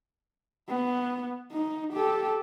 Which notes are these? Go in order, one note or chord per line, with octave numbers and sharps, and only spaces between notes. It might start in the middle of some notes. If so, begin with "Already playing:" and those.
B3
D#4
G4 A4